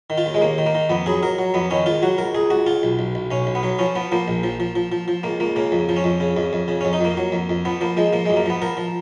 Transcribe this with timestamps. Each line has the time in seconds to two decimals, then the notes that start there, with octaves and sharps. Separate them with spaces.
0.10 D#3
0.18 F4
0.26 D#2
0.34 G#3
0.41 D#2 A#3
0.58 D#3
0.66 A#3
0.75 D#3
0.90 F2 B3
1.06 F#3 G#4
1.23 F#3 A#4
1.39 F#3
1.54 F2 B3
1.71 D#3 C#4
1.86 C#2 F4
2.02 F#3 F#4
2.18 C#2 A#4
2.35 C#2 G#4
2.50 C#2 F#4
2.67 C#2 F4
2.83 B1
2.99 B1
3.15 B1
3.31 B1 C#4
3.47 B1
3.55 B3
3.63 F#3
3.79 F3 C#4
3.95 F3 B3
4.12 F3 A#3
4.28 A#1
4.43 F3
4.60 F3
4.76 F3
4.92 F3
5.08 F3
5.23 C#2 A#3
5.40 C#2 A#3
5.56 C#3 A#3
5.72 F2
5.89 F3
5.97 C#4
6.04 F2
6.20 C#3
6.37 F2
6.53 F2
6.68 C#3
6.81 F2 C#4
6.93 D#4
7.01 F2 A#3
7.17 F#3
7.32 F2
7.49 F2
7.65 F3 B3
7.81 F3 A#3
7.97 F3 G#3
8.13 F3 A#3
8.26 F#2 G#3
8.37 A#3
8.46 F3 B3
8.62 F3 A#4
8.77 F3